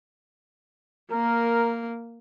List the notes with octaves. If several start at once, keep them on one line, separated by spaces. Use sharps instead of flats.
A#3 A#4